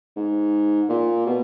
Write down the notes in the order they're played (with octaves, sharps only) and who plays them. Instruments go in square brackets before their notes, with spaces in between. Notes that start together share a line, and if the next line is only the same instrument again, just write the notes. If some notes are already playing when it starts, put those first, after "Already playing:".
[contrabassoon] G#2
A#2
B2